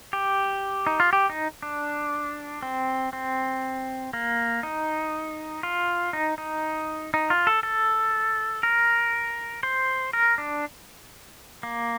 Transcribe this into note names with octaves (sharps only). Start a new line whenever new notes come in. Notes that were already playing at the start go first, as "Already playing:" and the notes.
G4
D#4
F4
G4
D#4
D4
C4
C4
A#3
D#4
F4
D#4
D#4
D#4
F4
A4
A4
A#4
C5
A#4
D4
A#3